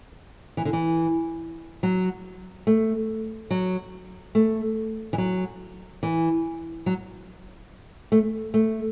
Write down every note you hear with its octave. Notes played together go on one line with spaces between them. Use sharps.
E3
D3
E3
F#3
A3
F#3
A3
E3
F#3
E3
F#3
A3
A3